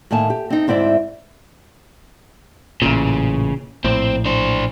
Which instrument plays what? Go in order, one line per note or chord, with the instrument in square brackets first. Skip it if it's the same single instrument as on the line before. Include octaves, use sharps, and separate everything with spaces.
[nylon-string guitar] A2 D#3 A#3 G#5 A5
G4
C4 D#4
D2 G#2 C4 E4 D5 E5
[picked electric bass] A1 A#2 [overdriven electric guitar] C#3
[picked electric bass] A#1 A2 [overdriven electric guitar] C4
[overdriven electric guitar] D4 C5